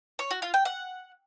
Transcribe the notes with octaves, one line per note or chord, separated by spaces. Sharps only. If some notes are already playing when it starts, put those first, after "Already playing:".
C#5
F#4
F4
G5
F#5